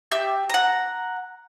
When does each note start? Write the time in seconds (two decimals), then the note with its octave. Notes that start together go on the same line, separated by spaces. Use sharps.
0.12 G4 E5 G6
0.50 F#5 A#5